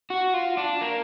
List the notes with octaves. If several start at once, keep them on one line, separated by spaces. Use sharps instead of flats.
F#4
F4
D4
A#3